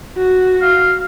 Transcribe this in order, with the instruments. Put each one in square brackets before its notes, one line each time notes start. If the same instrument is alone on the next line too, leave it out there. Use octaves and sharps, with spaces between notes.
[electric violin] F#4
[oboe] F5